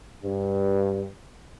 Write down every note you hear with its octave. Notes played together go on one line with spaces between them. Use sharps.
G2